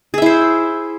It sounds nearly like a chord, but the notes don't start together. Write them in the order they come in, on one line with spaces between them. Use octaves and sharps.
G#4 E5 E4 C5